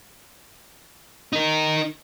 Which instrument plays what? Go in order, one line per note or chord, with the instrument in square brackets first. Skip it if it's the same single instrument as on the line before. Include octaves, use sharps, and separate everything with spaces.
[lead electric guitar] D#4 A#4